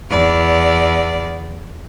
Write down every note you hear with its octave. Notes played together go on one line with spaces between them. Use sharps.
E2 D5